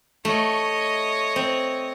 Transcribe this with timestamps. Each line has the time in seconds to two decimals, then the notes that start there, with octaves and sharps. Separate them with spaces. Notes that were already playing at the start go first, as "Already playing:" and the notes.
0.25 A3 C#5 D#5
1.36 C4